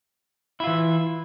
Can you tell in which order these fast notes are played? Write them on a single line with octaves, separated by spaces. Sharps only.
E4 F4 E3